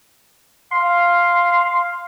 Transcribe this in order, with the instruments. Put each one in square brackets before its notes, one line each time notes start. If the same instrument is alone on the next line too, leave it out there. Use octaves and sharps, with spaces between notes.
[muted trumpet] F5 [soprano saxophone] C6